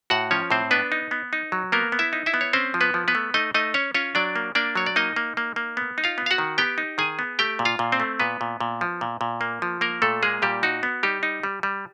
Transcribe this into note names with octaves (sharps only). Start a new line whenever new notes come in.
A2 F#4 F#5
F3 C#4 C#5
A2 C4 C5
B3 D4 B4
D#4
B3
D#4
F#3
A#3 B3 A#4
B3
E4 E5
D#4
E4 E5
B3
C#5
C4 C#4 C5
F3
B3 B4
F3
B3 B4
A3
A3 D#4 D#5
A3 D#4 D#5
C#4 C#5
C#4 F4 C#5
F#3 D4 D5
A#3
A#3 D4 D5
F#3 C#5
D5
A#3 D#4 D#5
A#3
A#3
A#3
B3
D#4
F4 F5
B3
F5
F#4 F#5
D#3
B3 G4 G5
D#4
D#3 G#4 G#5
B3
A3 G4 G5
A#2
F4 F5
A#2
C4 C5
A3
A#2 B3 B4
A#2
A#2
F3
A#2
A#2
A#3
F3
A#3 A#4
A#2 A3 A4
G#3 A#3 G#4
A#2 G3 G4
D#4 F#4
B3
G3 D#4 G4
D#4
G3
G3